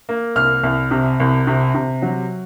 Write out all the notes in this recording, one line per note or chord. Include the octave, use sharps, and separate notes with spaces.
A#3
C2 F6
C2
C3
C2
C3
C3
F#3